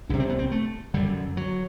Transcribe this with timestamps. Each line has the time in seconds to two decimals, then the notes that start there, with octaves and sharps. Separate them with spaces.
0.09 C2 C3 D4
0.20 C4
0.29 B3
0.39 C4
0.52 A3
0.94 F#2 D3 G3
1.37 F#3